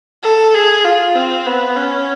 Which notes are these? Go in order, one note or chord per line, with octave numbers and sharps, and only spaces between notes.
A4
G#4
F4
C4
B3
C#4